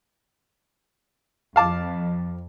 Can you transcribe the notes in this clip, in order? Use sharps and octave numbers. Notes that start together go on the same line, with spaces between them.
F2 F5 A5 D6